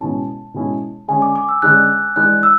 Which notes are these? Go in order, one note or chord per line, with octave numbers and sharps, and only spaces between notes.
B2 G#3 C#4 E4 A5
B2 G#3 C#4 E4
D3 G#3 C#4 G#4 G#5
D6
D6
E6
D3 G#3 C#4 G#4 F#6
E3 G#3 D4 F#6
E6